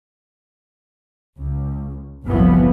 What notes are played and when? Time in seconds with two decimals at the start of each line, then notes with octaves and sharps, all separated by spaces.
1.37 C#2
2.26 F#1 C2 A2 E3 F3 B3